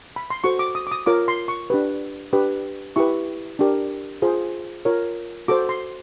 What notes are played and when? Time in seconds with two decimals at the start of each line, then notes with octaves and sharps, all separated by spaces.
0.16 B5
0.30 C6
0.44 F#4 A4 C5 C#6
0.59 D6
0.75 D#6
0.87 D6
0.91 D#6
1.06 F4 A#4 C#5 D6
1.28 C6
1.48 C#6
1.70 D4 G4 B4
2.33 D4 G4 B4
2.96 E4 G4 B4 C#6
3.59 D4 G4 A#4
4.22 F4 G#4 C5
4.85 F4 A#4 C#5
5.48 F#4 A4 C5 D6
5.69 C6